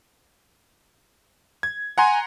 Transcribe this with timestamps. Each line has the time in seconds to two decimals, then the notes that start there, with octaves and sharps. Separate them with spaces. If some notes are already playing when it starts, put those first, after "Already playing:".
1.63 G#6
1.98 F#5 G#5 A#5 C6